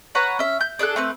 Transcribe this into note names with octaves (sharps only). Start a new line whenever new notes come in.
B4 C#5 F#5 A#5
C#4 E5
G6
D4 G#4 A4 F#6
A3 C4 B4